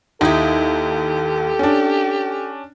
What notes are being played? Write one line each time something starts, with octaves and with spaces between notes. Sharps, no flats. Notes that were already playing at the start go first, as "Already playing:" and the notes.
D#2 D#4 E4 G4 A4
C#4 D4